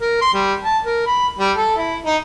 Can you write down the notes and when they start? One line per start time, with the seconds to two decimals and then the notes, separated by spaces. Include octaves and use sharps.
0.01 A#4
0.21 C6
0.34 G3
0.64 A5
0.85 A#4
1.06 B5
1.39 G3
1.57 A4
1.77 E4
2.06 D#4